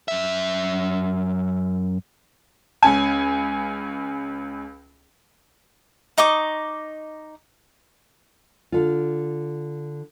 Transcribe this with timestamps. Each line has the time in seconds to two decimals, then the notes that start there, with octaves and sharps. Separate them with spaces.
0.08 F#2 E5
2.83 C#2 C#4 G#5
6.18 D#4 D#5 C#6 D6
8.72 D3 F4